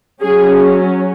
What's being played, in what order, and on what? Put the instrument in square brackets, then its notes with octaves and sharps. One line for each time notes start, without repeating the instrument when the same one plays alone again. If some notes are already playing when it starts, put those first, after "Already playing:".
[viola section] F#3 C#4 G#4